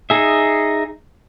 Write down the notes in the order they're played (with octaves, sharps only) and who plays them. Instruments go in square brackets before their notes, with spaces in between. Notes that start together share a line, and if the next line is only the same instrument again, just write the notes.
[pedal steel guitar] D#4 G#4 E5